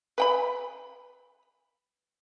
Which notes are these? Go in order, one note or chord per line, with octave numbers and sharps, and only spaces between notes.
B4 G5 B5